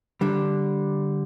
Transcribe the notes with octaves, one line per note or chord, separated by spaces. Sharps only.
D3 G3 D4